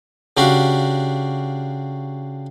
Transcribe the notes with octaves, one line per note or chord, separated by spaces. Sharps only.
C#3 D4 F#4 G4 F5